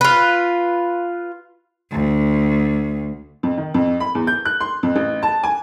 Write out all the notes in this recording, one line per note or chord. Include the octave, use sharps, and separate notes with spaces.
F4 B4
D2
F2
D#3
F2
B5
E2
G6
F#6
C6
F2
A1
A5
G#5